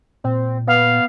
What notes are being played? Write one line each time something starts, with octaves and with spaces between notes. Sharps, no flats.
A#2 C4
B3 F5